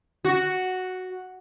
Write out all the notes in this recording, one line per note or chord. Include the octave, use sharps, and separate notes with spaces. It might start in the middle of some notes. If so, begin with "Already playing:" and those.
F#4